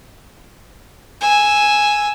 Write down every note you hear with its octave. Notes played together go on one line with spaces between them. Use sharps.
G#5 E6